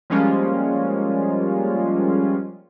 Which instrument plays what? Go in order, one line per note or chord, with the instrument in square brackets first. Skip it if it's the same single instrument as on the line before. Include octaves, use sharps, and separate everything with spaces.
[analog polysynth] F3 G3 G#3 A#3 C#4 F4